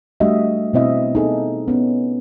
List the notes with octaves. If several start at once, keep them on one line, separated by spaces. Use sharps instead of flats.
G3 A3 D4 F#4 D#5 E5
B2 B3 C4 E4 D#5 E5
D#4 G#4 A4
B3 C#4